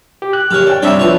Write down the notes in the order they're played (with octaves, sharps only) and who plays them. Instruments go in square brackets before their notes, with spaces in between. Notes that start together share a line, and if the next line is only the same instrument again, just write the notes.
[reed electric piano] G4
F#6
[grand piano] F#1 F6 [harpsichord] G4 C#5
[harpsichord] D4 [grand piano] C#5 G5
[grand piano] G2 C3 [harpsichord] C4 C#5 G5 [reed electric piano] D4 E5
[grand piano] F3 B3 F4 [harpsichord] B4 C#5